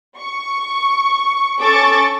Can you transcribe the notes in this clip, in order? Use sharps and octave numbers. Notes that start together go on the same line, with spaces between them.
C#6
C#4 A4 C#6 D6 A6